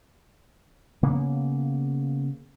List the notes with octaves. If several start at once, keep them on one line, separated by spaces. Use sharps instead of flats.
C#3 A#3 B3